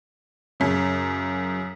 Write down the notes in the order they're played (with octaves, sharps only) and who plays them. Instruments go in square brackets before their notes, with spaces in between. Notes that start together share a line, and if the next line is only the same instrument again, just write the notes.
[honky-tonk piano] F#2 C#3